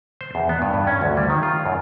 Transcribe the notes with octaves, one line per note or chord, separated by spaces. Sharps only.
C5
E2
B3
G2
G2
C#4
D2
G3
D#3
F4
F#2